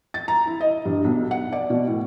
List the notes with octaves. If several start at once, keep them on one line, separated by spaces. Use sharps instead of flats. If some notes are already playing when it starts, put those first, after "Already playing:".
A6
A#5
E4
D#5
G2
B1
F#5
D5
B2
A2